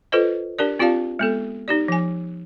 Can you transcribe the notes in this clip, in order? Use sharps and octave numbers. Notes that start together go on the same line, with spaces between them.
F4 A4 B4 C5 D#5
D4 G4 A#4 D5
C4 F4 G4 D5 F5 A5
G#3 B3 A4
D#4 G4 D5
F3 G#5